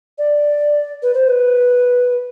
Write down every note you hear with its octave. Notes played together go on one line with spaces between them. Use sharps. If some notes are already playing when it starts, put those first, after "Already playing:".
D5
B4
C5
B4